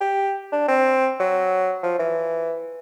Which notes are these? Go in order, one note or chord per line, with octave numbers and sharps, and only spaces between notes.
G4
D4
C4
F#3
F3
E3